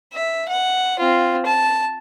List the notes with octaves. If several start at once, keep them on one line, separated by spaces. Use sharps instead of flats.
E5
F#5
C4 F4
A5